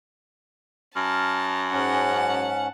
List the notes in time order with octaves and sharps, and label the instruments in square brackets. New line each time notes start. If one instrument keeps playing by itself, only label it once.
[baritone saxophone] F#2 [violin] A5 [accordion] F6
[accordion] G#2 C#4 [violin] F#5 A5